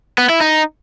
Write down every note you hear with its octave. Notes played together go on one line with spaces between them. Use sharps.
B3
E4
D#4